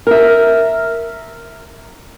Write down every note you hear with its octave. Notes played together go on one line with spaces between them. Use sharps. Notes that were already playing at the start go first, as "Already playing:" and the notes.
A#4 E5